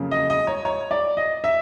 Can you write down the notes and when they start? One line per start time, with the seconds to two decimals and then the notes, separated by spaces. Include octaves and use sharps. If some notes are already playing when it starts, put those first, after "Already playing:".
Already playing: F2 C#3 F#3 A#3
0.11 D#5
0.30 D#5
0.47 C#5
0.65 C#5
0.91 D5
1.17 D#5
1.44 E5